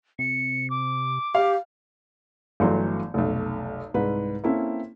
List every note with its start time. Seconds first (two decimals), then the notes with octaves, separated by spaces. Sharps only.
0.19 C3 C#7
0.70 D6
1.35 G4 F5
2.60 G1 E3 F#3 A3 C6
3.14 F1 B1
3.94 C2 G#2 B4
4.44 A#3 C4 C#4 E4 A4